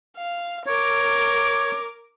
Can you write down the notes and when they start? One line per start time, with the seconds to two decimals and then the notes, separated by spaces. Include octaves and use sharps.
0.17 F5
0.66 A#4 C#5 D6